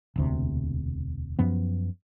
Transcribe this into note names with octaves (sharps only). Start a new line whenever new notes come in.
E1 D2 C3
F#2 F3 B3